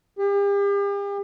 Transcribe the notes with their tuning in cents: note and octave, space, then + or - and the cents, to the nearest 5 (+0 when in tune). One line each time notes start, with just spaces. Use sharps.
G4 +40